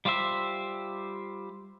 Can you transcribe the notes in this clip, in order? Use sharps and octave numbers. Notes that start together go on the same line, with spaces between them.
G3 F4 G4 C5 E5